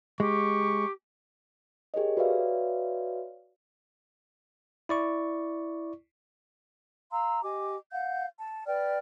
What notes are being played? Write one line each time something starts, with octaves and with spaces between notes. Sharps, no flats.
G#3 G4 C#6
G4 G#4 A#4 C#5 D#5
F#4 B4 C#5 D5 E5 F5
E4 D5 C#6
F5 A#5 C6 E6
G4 D#5 G#5 D6
F5 F#5 G6
A5
B4 D5 G5 F6